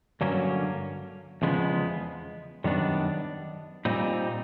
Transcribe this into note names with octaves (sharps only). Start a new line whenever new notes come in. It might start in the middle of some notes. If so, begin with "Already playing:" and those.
G2 D3 F#3 A#3 C#4
E2 C#3 F3 G#3 B3
F#2 D#3 G3 B3 D4
A#2 G3 C4 D#4